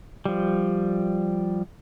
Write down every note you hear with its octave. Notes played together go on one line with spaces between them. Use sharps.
F3 G3